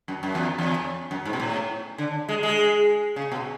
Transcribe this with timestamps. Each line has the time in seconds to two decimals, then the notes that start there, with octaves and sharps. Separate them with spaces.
0.08 F#2
0.23 F#2
0.35 E2
0.59 E2
1.11 F#2
1.25 G#2
1.33 B2
1.40 A2
1.98 D3
2.29 G#3
2.43 G#3
3.16 C#3
3.32 B2